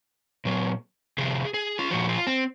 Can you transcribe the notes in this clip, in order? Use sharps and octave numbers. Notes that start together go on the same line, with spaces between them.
A#2 F#3
C3 F3 G#4
G#4
F4
A#2 F3 F#4
F4
C4